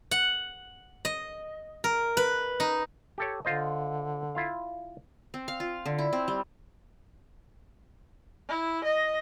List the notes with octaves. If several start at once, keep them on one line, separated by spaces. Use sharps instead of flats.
F#5
D#5
A#4
B4
D#4
G4 A4 C#5
D3 F4 C5 D#5
E4 F4 F5
C4
F5
F4
D3
E4
C4
G3
E4
D#5